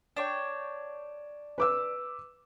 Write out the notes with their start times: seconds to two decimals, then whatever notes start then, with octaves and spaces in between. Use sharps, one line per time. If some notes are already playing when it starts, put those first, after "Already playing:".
0.17 D4 C#5 G5
1.58 B4 D6 E6